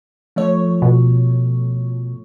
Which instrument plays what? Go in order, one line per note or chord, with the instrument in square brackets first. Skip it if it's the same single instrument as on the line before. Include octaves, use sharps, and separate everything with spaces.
[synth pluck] F3 A3 C#5
[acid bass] B2